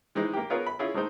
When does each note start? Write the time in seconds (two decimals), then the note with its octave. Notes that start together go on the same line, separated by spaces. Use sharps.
0.15 E3 G#3 C4 D#4
0.33 A#3 G4
0.50 B3 F4 G#4 A#4 C#5
0.66 B5
0.79 C#4 E4 F4 G#4
0.94 G#3 A3 C4 D#4 C5